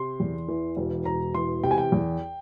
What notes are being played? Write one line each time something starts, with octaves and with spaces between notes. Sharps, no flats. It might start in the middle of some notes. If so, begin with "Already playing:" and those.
Already playing: C3 C6
E2
E3
E1
E1 A#5
E3 C6
C3 G5
G#5
G5
E2